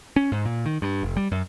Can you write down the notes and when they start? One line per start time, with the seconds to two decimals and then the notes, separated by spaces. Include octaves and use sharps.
0.16 C#4
0.32 G#2
0.45 A#2
0.66 D#3
0.82 G2
1.03 F1
1.17 G3
1.32 F#2